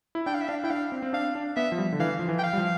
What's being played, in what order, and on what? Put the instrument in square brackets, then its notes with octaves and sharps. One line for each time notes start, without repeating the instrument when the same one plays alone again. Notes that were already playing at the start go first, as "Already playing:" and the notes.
[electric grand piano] E4
[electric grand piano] D4 [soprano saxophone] G5
[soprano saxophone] F5
E5
[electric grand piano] D4 [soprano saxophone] F5
[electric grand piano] E4 [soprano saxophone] G5
[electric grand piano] D4 [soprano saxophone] F5
[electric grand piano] C4
C4
[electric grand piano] D4 [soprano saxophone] F5
[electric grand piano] D4
[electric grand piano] B3 [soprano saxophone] E5
[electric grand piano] F3
G3
D3
[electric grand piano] E3 [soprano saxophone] F5
[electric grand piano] F3
E3
[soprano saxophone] G5
F5
[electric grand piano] G3
F3